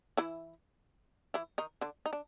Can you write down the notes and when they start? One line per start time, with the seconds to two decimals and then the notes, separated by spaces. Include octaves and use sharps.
0.17 E3 E4
1.34 E3 E4
1.58 D#3 D#4
1.81 D3 D4
2.06 D#4
2.13 D4